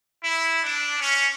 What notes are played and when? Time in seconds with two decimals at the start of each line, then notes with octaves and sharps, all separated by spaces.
0.23 E4
0.62 D4
0.98 C#4